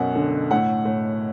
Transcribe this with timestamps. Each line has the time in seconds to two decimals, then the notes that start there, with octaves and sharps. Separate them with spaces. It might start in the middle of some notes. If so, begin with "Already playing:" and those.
Already playing: B1 F#2 B2 F#5
0.15 D3
0.51 A2 F#5
0.85 A2